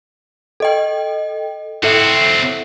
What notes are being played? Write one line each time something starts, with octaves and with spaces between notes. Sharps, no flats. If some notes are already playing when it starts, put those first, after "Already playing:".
A4 D#5 G5
C4 E4 F#4 A4 E5